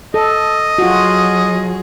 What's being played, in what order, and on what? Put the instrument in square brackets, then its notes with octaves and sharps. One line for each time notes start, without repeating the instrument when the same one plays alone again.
[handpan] A4 [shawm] D#5
[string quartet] F#3 G#4 [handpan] F4 F#4